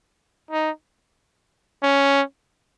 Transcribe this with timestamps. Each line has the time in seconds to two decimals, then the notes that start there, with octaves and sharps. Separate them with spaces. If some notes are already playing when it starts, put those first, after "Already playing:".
0.51 D#4
1.82 C#4